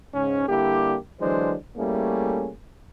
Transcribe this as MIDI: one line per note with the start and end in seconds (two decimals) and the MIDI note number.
0.14 0.45 44
0.14 0.45 49
0.14 0.45 61
0.48 0.97 50
0.48 0.97 55
0.48 0.97 58
0.48 0.97 64
0.48 0.97 67
1.20 1.55 50
1.20 1.55 52
1.20 1.55 54
1.20 1.55 56
1.20 1.55 62
1.20 1.55 72
1.77 2.50 55
1.77 2.50 57
1.77 2.50 58
1.77 2.50 61
1.77 2.50 64
1.77 2.50 68